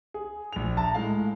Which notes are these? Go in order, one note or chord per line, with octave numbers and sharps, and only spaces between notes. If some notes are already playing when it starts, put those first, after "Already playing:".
G#4
A#1 F7
E5 A5 A#5
A2 G#3 F5